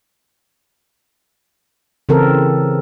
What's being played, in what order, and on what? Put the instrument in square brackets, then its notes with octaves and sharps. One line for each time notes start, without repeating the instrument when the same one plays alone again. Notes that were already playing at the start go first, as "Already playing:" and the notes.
[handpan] C#3 E3 C4 A4 A#4